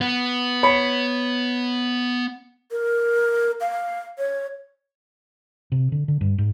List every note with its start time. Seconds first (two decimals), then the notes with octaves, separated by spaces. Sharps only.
0.01 B3
0.63 C#5 B5 C#7
2.70 A#4
3.61 F5
4.18 C#5
5.72 C3
5.92 D3
6.08 D3
6.21 G2
6.38 G#2